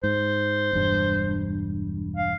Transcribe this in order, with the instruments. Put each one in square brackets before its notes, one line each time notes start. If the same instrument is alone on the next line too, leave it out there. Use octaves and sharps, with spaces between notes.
[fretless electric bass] G#2 [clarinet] C5
[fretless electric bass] E1 G2
[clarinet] F5